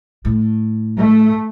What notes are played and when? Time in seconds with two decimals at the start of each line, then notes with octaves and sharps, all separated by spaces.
0.25 A2
0.98 A3